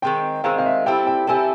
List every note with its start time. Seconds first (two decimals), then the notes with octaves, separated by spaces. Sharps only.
0.02 D#3 G#3 C4 G5
0.44 D#3 G#3 C4 F5
0.58 F5
0.66 E5
0.86 G3 C4 E4 A4 G5
1.07 G5
1.27 G3 C4 E4 A4 G#5